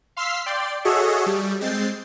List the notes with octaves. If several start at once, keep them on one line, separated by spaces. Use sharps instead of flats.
F5 C6 E6 F6 B6 C7
D5 G5 C6
F#4 G#4 A4 C#5 D#5 E5
G3
G#3 C4 G6 A6 C7